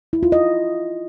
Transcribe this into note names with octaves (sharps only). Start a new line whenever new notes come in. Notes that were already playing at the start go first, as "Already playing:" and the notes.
E4
F4
D#5